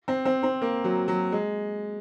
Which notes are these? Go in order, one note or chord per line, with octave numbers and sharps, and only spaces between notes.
C4
C4
C4
A#3
F#3
F#3
G#3